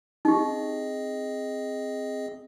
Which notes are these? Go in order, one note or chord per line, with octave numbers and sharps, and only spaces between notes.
C4 D#4 G4 G#4 D#5